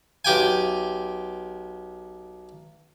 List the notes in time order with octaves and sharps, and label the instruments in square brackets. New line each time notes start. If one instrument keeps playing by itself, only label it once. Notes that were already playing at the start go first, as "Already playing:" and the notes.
[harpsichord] B1 G4 G5 G#5